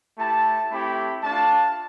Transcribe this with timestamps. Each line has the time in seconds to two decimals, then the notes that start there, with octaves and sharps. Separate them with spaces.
0.18 A3 E4 G4 A5
0.71 A3 C4 E4 G4 B5
1.23 A3 D4 F4 A5